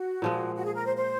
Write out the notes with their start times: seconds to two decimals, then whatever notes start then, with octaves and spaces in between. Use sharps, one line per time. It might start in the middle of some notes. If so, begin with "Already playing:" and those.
Already playing: F#4
0.22 A#2 F3 G#3
0.55 F#4
0.65 G#4
0.75 A#4
0.86 C5
0.97 C5